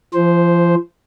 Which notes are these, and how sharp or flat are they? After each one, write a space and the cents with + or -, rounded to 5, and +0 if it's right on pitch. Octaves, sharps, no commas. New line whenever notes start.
F3 -35 C5 +0